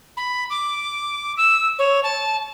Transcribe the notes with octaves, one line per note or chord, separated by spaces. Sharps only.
B5
D6
E6
C#5
A5